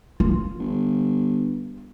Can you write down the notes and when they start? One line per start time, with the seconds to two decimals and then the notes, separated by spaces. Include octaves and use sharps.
0.20 F4
0.59 G1